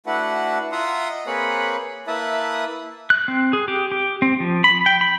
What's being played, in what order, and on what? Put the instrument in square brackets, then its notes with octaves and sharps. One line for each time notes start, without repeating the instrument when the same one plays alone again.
[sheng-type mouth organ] A3 D4 E4 F#4 B4 F#5
F4 E5 F#5 A#5 C6 D#6
D#5
A#3 C4 G#4 B4 C#5 B5
A#3 E4 B4 E5 A5 D#6
[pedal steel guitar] F#6
C4
G#4
G4
G4
C4
F3
B5
G5
B5